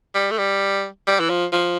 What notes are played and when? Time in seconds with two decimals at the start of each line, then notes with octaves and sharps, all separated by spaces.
0.14 G3
0.31 A3
0.38 G3
1.07 G3
1.19 E3
1.29 F3
1.52 F3